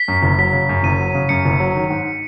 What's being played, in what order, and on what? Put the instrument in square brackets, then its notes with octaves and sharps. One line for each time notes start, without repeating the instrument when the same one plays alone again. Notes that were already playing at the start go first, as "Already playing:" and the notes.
Already playing: [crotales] B6
[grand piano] F#2
F#1
[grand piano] F#3 [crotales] B6
[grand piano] C#3
F#2
[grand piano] F#1 [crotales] D#7
[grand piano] F#3
C#3
[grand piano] F#2 [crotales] C#7
[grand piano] F#1
F#3
D#3
G#2